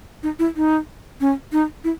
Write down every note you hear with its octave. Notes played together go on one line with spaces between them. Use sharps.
D#4
E4
D#4
C#4
D#4
E4